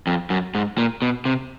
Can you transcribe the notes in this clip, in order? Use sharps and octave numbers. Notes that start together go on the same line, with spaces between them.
F2
F#2
G#2
A#2
B2
C3